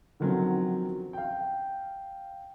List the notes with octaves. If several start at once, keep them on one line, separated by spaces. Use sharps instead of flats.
D3 D#3 F3 F#3 C4 C#4
F5 G5